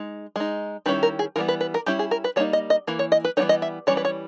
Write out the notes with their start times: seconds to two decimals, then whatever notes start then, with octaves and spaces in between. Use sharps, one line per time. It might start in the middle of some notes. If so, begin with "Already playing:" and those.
Already playing: G#3 D#4
0.36 G#3 D#4
0.86 D#3 G3 C#4 E4 B4
1.03 A#4
1.19 G#4
1.36 E3 G3 B3 A#4
1.48 B4
1.61 B4
1.74 A#4
1.86 G3 C#4 E4 G4
1.99 G#4
2.11 A#4
2.24 B4
2.36 G3 A#3 D#4 C#5
2.53 D#5
2.70 D#5
2.87 E3 A#3
2.99 C#5
3.12 D#5
3.24 B4
3.37 E3 G3 B3 D#4 C#5
3.49 D#5
3.62 E5
3.87 E3 G3 C#4 C#5
3.97 B4
4.05 C#5